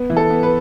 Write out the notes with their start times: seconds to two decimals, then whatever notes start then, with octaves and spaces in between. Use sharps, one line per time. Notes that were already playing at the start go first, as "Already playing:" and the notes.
Already playing: B3
0.10 E3
0.17 A4
0.30 B3
0.43 B4